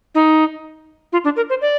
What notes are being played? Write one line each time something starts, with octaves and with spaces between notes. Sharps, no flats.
D#4
F4
D4
A#4
C5
D5